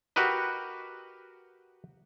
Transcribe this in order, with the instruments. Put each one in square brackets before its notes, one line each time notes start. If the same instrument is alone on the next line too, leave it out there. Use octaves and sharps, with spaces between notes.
[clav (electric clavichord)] F#4 G4 A#4 B4 D#5